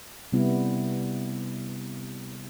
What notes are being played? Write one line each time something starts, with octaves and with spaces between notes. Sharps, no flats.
C3 G3 B3 E4